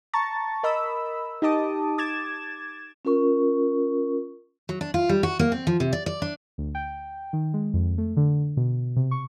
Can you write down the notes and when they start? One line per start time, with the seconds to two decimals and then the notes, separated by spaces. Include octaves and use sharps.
0.14 A5 A#5 C#6 A6
0.63 A#4 D#5 B5 E6
1.42 D#4 G4 D#5 A5 D6 D#6
1.98 D6 G#6 A6 E7
3.05 C#4 F4 A#4 C#6
4.69 F#3
4.81 D4
4.94 F4
5.09 G3
5.23 F#4
5.39 A#3
5.52 C4
5.67 F3
5.80 C3
5.93 D5
6.06 D5
6.22 D4
6.58 D2
6.75 G5
7.33 D#3
7.54 G#3
7.74 F2
7.98 A3
8.17 D3
8.57 B2
8.96 C3
9.11 C#6